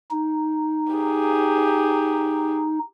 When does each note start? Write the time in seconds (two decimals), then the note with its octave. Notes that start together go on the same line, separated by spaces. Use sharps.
0.11 D#4
0.93 G4 G#4